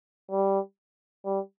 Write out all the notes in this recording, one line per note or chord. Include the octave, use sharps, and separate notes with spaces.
G3
G3